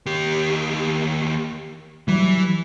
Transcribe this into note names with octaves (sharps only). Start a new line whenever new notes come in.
D#2 G4
E3 F#3 G3